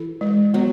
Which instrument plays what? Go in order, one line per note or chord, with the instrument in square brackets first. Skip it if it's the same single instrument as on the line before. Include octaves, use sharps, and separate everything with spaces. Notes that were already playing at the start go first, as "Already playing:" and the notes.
Already playing: [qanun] E3 [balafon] A4
[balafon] G#3
[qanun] F#3 [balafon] B3